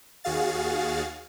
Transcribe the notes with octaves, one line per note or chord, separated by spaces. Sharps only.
D#2 F#4 G#4 F5 A6